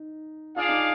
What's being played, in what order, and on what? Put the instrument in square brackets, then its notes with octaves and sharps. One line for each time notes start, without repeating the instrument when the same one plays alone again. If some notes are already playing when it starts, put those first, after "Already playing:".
Already playing: [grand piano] D#4
[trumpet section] D4 G#4 D5 F5 [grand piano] F4
[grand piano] D#4